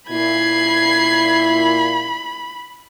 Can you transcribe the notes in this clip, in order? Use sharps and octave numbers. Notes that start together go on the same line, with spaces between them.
A#2 E4 B5 G#6 C7